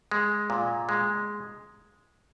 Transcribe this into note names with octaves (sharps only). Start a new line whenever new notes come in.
G#3
A#2
G#3